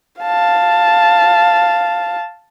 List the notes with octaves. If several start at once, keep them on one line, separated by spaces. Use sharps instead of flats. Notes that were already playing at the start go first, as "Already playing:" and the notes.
F5 A5